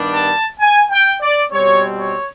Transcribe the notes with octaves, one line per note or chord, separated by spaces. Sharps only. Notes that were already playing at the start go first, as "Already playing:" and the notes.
Already playing: G2 D#3 G3 B3 D4
A5
G#5
G5
D5
B2 G3 C4 C#5
C#5